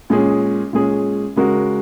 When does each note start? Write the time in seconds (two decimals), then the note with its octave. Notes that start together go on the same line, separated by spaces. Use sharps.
0.10 A#2 G#3 C#4 G#4
0.73 A#2 G#3 C#4 G#4
1.36 C#3 G#3 F#4 A#4